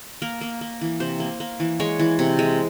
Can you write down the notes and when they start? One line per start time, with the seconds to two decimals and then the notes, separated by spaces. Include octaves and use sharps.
0.22 A#3 A#4
0.41 A#3
0.61 A#3
0.81 E3
1.00 C3 C5
1.20 A#3
1.40 A#3
1.60 E3
1.80 G#3 C#5
1.99 E3
2.19 C3
2.39 G#3